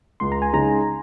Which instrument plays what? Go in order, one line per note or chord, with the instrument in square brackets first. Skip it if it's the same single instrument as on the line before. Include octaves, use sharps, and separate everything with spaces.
[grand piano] C#2 [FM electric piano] C6
[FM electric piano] A#5
G#5
[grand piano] C#3 G#3 D#4 [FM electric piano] A#5